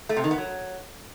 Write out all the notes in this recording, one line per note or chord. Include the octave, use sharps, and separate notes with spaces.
A3
C3
D#3
B3
F#3